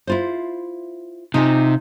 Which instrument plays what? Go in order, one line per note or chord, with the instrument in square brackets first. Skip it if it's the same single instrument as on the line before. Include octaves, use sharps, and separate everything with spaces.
[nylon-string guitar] E4 F4 C5
[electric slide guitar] C3 [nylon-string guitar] D#4 F4 G#5